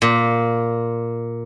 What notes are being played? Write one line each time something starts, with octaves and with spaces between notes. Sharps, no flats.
A#2